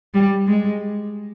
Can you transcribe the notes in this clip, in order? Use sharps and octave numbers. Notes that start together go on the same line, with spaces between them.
G3
G#3